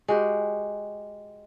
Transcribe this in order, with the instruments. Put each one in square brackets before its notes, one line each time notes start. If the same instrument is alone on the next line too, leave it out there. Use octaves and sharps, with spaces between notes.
[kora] G#3 F#4 G4